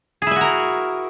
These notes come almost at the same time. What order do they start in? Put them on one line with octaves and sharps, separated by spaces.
G#4 E4 G#5 F#4 A#4